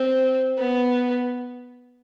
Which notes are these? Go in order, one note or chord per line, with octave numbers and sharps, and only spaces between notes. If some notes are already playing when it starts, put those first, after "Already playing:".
Already playing: C4
B3